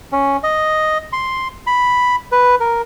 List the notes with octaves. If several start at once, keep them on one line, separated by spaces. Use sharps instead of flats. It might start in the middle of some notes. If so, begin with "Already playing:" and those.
C#4
D#5
C6
B5
B4
A#4